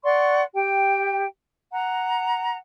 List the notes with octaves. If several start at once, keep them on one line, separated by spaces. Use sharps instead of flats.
D5 F#5 C6 C#6
G4 G5
F#5 A#5